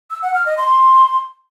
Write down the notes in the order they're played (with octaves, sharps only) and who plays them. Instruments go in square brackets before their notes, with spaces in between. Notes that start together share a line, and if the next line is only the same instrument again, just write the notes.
[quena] E6
F#5
F6
D#5
C6